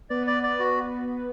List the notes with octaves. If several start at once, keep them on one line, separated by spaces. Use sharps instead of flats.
B3 B4 D5
D5
D5
F#4